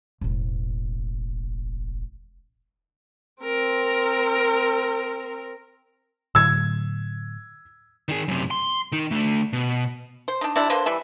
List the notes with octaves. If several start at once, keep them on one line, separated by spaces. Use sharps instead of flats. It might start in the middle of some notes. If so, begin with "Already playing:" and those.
E1 A1
C4 A#4
A2 D3 F#3 E6 G#6
D#3 G#4
F#2 C3
C6
D#3 D#4
D3 A3
B2
C5
D4 D#4
C3 D4 E4
D3 A#3 B4 C5
E3 G3 E5